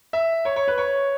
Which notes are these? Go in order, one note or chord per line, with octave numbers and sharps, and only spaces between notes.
E5
C#5
C#5
B4
C#5